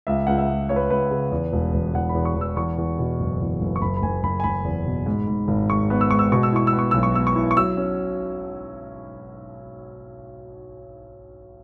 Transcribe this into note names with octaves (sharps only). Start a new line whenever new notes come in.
C#2 E5
C#2 F#5
E5
C#2
C#2 C#5
B4
C#2 B4
C#3
E2
E1
E1
E2 F#5
B5
E2
C#6
E2
E6
E2 C#6
E2
B2
F#1
E2
F#1
C#6
F#1 B5
B5
F#1 G#5
F#1 B5
G#5
F#1 B5
E2
B2
G#2
G#2
G#1
G#2 C#6
B3
E6
G#2 C#6
E6
B2 C#6
E6
E4 C#6
E6
B3
C#6
B1 E6
C#6
B3 E6
C#6
E4
C#6
F#3 E6
C#4